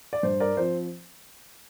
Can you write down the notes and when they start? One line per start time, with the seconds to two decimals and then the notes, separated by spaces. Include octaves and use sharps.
0.13 D5
0.23 G2 C5
0.40 A#4 D5
0.57 F3 C4 C5